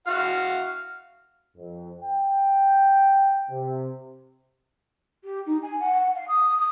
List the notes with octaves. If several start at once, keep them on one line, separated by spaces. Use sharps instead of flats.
F#4 F5 F#5
F2
G5
C3
G4
D#4
G#5
F#5
F#5
F5
D#6
D#6